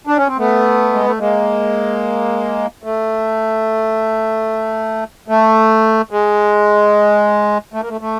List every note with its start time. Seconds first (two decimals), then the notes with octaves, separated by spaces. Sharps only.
0.07 D4
0.17 C#4
0.27 C4
0.38 A3 B3
0.93 G#3
1.06 A3
1.19 G#3 A#3
2.83 A3
5.28 A3
6.11 G#3
7.74 A3
7.82 A#3
7.89 A3
8.01 A3